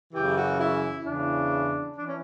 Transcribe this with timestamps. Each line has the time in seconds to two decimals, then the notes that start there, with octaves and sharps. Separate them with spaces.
0.13 F#2 C#3 E3 G4
0.36 F#4
0.59 E4
1.05 E2 C#3 E3 D4
1.97 E3 D4
2.07 C#4